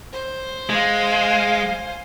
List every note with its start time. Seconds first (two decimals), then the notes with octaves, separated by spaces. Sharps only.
0.13 C5
0.70 G#3 F5 G#5